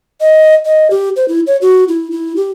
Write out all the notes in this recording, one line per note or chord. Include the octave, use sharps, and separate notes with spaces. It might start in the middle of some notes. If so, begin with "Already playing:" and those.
D#5
D#5
G4
C5
E4
C#5
F#4
E4
E4
G4